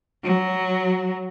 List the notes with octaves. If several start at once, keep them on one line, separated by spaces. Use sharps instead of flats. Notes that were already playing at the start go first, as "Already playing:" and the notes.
F#3